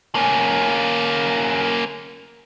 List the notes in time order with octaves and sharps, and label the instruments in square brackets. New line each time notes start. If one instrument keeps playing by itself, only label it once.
[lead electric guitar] A#3 C#4